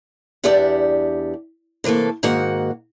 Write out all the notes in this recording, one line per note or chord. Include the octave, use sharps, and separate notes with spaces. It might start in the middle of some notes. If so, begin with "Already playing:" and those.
E2 D4 G4 D5 E5 F#5
C3 E3 A3 A#3 A4
G#2 D#3 A#3 F#4 F#5